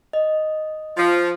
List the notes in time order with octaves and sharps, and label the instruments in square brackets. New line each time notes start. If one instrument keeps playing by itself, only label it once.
[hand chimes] D#5
[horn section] F3